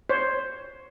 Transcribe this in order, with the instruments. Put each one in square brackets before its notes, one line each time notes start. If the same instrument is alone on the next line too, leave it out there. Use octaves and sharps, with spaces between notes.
[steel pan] C5 C#5